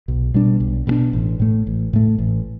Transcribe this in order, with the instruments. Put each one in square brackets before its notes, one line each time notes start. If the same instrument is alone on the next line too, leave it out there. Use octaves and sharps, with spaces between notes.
[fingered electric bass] B1
B2 G3 D4
B1
B2 G3
D4
A1
A2 A3
A1
A2 A3
A1